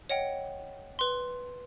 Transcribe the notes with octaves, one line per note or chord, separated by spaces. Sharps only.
C#5 D#5 F#5 G5
B4 C6